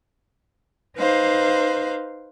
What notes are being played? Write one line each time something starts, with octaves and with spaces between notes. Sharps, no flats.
D#4 B4 C5 F5